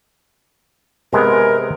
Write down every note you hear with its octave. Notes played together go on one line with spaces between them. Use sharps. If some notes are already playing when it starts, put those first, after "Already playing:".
C3 G#3 B3 A#4